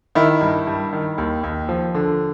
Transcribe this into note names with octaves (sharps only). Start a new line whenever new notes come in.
D#3 E4
G2
G2
D#3
D#2
D#2
F3
D3